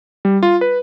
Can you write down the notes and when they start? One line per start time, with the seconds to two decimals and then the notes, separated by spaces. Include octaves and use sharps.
0.25 G3
0.43 F4
0.61 B4